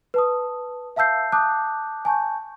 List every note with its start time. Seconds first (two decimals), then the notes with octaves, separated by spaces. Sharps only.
0.14 B4 A5 D#6
0.96 E5 F5 A5 E6 G6 C7
1.32 A5 D6 D#6 F#6 G6
2.05 G#5 A5 C#6 G6